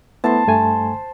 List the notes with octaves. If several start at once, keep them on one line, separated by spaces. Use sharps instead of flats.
A3 B3 E4 C5 A5
G2 A3 G#5